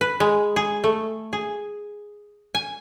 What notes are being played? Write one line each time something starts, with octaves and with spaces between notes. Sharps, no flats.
B4
G#3
G#4
A3
G#4
G#5